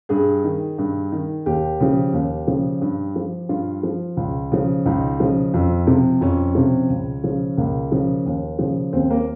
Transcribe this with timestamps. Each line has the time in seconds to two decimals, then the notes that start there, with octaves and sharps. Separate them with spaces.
0.09 G2 G#4
0.44 D#3
0.78 G2
1.12 D#3
1.46 D#2 G4
1.80 C#3 F3
2.13 D#2
2.47 C#3 F3
2.81 G2
3.16 F3
3.49 G2 F4
3.83 F3
4.17 C#2
4.52 C#3 F3
4.86 C#2 D#4
5.20 C#3 F3
5.54 F2
5.87 C3 F3
6.21 F2 C#4
6.55 C3 F3
6.90 C#2
7.23 C#3 F3
7.57 C#2 A#3
7.92 C#3 F3
8.26 D#2
8.59 C#3 F3
8.93 D#2 C4
9.10 A#3